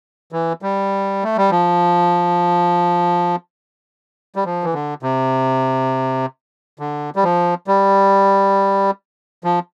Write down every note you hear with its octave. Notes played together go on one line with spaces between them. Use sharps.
E3
G3
A3
G3
F3
G3
F3
E3
D3
C3
D3
G3
F3
G3
F3